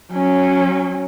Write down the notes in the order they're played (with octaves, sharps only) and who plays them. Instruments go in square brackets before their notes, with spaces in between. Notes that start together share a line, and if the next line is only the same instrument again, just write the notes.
[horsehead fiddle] F#3 C#4